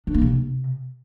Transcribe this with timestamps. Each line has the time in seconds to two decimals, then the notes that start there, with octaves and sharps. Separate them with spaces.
0.07 D4
0.14 A#3
0.22 C3